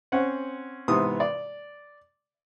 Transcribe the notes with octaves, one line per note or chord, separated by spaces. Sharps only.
C4 C#4 F#5
G#2 C3 E3 B3 D#6
D5